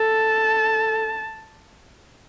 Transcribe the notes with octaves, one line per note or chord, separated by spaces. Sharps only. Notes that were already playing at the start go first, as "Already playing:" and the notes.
Already playing: A4 A5